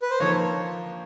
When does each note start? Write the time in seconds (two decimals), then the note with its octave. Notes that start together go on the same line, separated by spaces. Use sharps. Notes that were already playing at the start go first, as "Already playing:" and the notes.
0.02 B4
0.10 C5
0.20 D3 F3 A#3 D#4 C#5